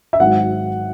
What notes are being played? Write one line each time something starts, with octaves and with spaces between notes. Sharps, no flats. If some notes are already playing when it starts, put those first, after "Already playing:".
E5
G#1 G#2 F#3 F#5